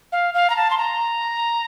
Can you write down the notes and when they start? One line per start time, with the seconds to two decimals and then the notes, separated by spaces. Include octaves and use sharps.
0.12 F5
0.34 F5
0.50 A#5
0.56 A5
0.71 C6
0.78 A#5